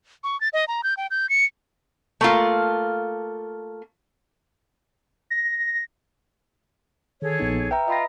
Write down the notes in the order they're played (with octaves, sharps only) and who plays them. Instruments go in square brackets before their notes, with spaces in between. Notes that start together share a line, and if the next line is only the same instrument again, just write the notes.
[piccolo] C#6
A6
D#5
A#5
G6
G5
G6
C#7
[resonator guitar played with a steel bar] A3 A#3 F4
[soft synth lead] A#6
[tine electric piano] D#3 [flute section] G#4 A4 C#5
[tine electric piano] A#1 B3 D#4
[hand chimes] B4 E5 A#5 [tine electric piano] G5
[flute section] F4 [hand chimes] D#5 B5 A#6